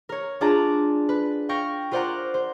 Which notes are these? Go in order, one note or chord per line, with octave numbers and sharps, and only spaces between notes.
A#4 C#5
D4 F4 G#4 D5 A5 A#5
B4
F5 G5 C#6 A#6
F4 A#4 C5 D5 F#5 A#5
C5